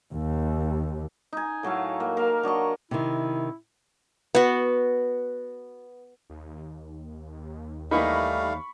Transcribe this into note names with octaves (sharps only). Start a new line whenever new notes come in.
D#2
D#4 G#5
A2 F#3 A4 F5
A#3
A#3 A#4 F5
F#3 D4 D#5 C#6
C3 D#3 E4
B3 F#4
D#2
E3 G3 A3 A#3 D#4 F5 B5 C#6